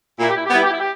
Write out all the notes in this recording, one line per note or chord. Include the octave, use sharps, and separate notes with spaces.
A#2 E4
G4
E4
G4
G3 B3 E4
G4
E4
G4